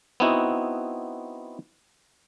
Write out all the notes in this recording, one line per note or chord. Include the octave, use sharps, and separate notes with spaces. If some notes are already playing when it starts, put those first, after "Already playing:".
B3 C4 D#4 E4 F#4